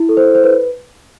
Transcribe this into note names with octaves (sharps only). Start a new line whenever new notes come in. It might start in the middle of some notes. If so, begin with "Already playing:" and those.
Already playing: E4
A4
C5
C5
B4